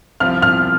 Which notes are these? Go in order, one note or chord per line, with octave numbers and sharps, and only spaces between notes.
C2 C3 F3 C4 F4 F6
F6